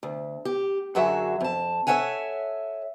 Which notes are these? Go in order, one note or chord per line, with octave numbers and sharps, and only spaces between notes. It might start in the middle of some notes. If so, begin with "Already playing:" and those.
D2
G4
F#2 D3 F#3 F#4 G#4 E5
F2 A5
A4 A#4 C#5 E5 F#5 G#5